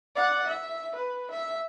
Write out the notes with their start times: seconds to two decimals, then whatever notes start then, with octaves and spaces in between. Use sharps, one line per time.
0.16 D5 F#5
0.47 E5
0.96 B4
1.31 E5